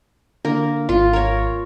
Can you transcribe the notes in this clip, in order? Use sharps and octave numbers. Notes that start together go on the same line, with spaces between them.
D3 A#3 A#4
G#1 F4
A#4 C#5